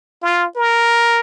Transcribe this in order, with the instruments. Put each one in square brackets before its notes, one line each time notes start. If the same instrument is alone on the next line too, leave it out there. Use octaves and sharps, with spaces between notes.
[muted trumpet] F4
A#4